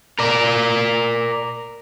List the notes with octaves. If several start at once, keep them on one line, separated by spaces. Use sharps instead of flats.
A#4 D5